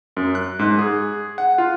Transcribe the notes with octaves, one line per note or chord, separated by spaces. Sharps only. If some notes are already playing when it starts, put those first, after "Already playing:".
F#2
F#6
G#2
G#4
F#5
F4